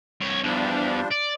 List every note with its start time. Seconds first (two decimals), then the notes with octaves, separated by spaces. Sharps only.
0.21 C2 C#5
0.44 E2 F3 G3 D4
1.11 D5